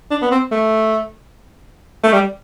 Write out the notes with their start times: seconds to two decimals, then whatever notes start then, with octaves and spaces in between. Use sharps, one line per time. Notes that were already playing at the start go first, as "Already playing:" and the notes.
0.11 D4
0.22 B3
0.31 C4
0.51 A3
2.03 A3
2.13 G3